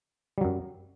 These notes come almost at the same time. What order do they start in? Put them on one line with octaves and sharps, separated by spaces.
G3 F#3 F#2